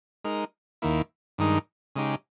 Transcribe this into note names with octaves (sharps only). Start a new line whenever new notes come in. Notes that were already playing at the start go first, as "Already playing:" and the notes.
G#3 D#4 A#4
D#2 D#3 A#3 E4
G2 D#3 G#3 D#4
C#3 G#3 D#4 G4